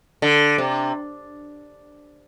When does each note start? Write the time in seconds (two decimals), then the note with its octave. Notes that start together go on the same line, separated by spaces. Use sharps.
0.22 D3
0.58 C3